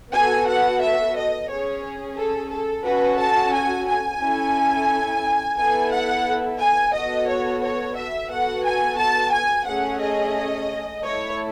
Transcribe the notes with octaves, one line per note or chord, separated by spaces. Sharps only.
B3 F#4 A4 G#5
F#5
E5
D#5
C#4 G#4 C#5
A4
A4
C#4 F#4 A4 B4
A5
G#5
G#5
C#4 E4 A4
B3 E4 A4 G#5
F#5
G#5
B3 F#4 A4 D#5
C#5
C#5
E5
B3 F#4 A4 F#5
G#5
A5
G#5
A3 C#4 G#4 F#5
D#5
A3 E4 A4 C#5